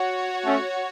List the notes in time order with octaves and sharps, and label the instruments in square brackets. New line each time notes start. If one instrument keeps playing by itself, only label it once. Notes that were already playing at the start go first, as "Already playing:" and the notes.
Already playing: [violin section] F#4 C#5 F#5
[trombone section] A3 C#4